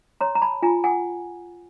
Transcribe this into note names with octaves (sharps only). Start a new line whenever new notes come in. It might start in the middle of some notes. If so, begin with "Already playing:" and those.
C#5 A#5 C6
A#5
A5 B5
F4 G#5 A#5
F#5 G#5